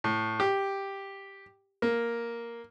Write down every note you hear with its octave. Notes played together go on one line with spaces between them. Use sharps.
A2
G4
A#3